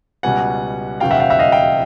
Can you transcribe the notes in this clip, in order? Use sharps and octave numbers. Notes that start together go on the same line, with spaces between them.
C#2 B2 G3 B3 F#5 G#5
E1 D#2 C#3 F#3 B3 F5 G5
E5 F#5
F5 G5
E5 F#5
D#5 F5
F5 G5